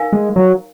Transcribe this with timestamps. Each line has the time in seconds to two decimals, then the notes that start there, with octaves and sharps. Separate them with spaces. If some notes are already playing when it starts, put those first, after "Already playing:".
Already playing: D#4 A#4 F5 G#5
0.13 G#3
0.36 F#3